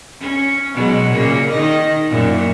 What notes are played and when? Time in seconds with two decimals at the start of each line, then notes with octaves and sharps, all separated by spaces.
0.20 C#4
0.74 B2 F#3 G#3
1.10 A#2 C#3 A#3
1.50 D#3 D#4 D#5
2.10 F#2 A#2